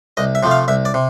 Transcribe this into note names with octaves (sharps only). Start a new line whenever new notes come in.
C2 D#5
E5
C3 F3 A3
F5
C2 E5
D5
C3